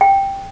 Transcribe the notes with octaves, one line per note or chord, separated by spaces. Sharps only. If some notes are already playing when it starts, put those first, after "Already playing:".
G5